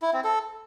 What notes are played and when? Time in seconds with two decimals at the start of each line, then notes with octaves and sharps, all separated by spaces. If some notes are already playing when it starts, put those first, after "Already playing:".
0.02 E4
0.13 C4
0.24 A4